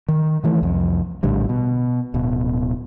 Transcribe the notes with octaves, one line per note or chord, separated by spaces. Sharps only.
D#3
D#3 E3 A3
C2 F2
A#1 A2 D3 G3
B2
D1 B2